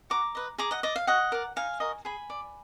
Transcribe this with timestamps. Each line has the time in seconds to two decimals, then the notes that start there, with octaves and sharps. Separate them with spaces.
0.10 F#4 A#5 D6
0.35 B4 D#5
0.58 G#4 A#5 D6
0.71 D#5 F#5
0.83 D5 D#5
0.96 F5
1.07 F#4 D#5 F#5
1.32 A#4 D5
1.56 D#4 F5 G#5
1.80 F#4 A#4 D#5
2.05 G#4 G#5 B5
2.30 D5